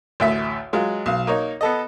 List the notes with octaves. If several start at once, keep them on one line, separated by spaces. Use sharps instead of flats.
A1 D2 E5
F#3 G#3 F4
B1 F5
A#3 D#4 C#5
B3 A4 D#5